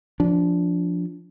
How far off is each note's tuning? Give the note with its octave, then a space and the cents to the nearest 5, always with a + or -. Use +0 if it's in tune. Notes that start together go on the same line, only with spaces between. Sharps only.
F3 +0 D4 -15